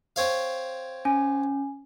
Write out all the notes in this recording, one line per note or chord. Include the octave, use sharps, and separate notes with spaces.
C4 C#5 F5
C#4 G#5